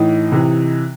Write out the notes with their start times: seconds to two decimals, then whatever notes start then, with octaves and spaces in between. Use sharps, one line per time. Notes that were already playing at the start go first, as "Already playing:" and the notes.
Already playing: A2 E3 D#4
0.32 C3 E3